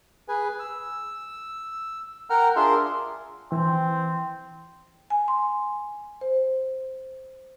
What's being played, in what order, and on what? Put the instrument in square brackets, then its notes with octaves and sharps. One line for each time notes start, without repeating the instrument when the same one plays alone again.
[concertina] G#4 B4 G#5
E6
A#4 F#5 G5 A#5 F6
D4 F4 G#4 A#4 E5 C6
[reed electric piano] E3 [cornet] C4
[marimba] G#5
C6
C5